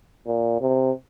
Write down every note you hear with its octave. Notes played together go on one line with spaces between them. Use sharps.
A#2
C3